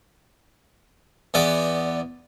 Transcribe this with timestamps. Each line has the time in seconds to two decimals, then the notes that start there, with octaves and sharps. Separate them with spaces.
1.34 E2 B3 D5